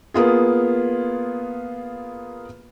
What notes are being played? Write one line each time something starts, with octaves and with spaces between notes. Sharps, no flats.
A#3 B3 F4 G#4